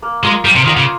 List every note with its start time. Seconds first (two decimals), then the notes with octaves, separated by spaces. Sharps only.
0.02 A#3
0.23 G#3 F4 A#4 D#5
0.45 G3 A#3
0.56 C3
0.66 D#3 F4 A#4 D#5
0.77 C#3